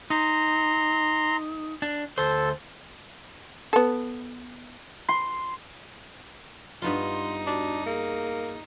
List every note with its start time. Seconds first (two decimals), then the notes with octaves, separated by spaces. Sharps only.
0.10 D#4 A#5 C6
1.82 D4
2.18 D2 A4 C5
3.73 B3 A4
5.09 C6
6.82 G2 B3 D#4 F4 C6
7.46 D4 F#4
7.86 A#3 G#4